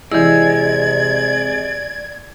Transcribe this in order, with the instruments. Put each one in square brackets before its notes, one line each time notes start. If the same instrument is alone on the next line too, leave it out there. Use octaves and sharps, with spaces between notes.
[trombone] C3 [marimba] E3 E4 [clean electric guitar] G#3 [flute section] D5 G#6